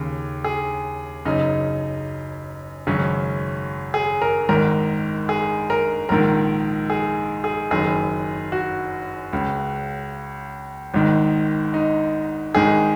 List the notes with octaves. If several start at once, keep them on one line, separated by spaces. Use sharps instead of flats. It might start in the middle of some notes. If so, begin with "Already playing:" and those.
Already playing: D#2 C#3
G#4
F#1 F#2 C#3 D#4
G#1 F#2 C#3 C#4
G#4
A#4
G#1 G#2 D#3 A#4
G#4
A#4
A#1 G#2 D#3 A#4
G#4
G#4
F#1 F#2 D#3 G#4
F#4
C#2 C#3
G#1 G#2 D#3
D#4
G#1 G#2 D#3 G#4